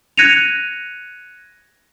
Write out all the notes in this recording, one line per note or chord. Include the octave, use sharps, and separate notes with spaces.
F#6 G#6 A#6 C#7 D#7 F7